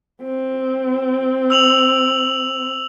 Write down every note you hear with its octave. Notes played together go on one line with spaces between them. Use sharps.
C4
E6 F7 F#7